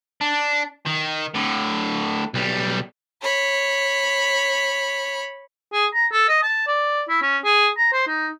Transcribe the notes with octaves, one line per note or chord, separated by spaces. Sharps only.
D4
D#3
A2 D3
B1 G3
C#5 B5
G#4
A#5
A4
D#5
A5
D5
E4
C#4
G#4
A#5
C5
D#4